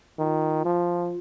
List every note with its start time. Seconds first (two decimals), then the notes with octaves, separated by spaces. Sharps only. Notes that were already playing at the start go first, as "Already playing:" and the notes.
0.18 D#3 F4
0.65 F3